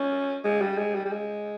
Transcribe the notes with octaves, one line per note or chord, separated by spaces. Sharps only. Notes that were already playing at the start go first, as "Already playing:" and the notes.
Already playing: C#4
G#3
G3
G#3
G3
G3
G#3